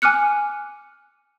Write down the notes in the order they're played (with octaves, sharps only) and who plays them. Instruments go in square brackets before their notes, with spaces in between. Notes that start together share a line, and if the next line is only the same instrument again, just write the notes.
[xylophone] G#5 D6 F6 F#6 C#7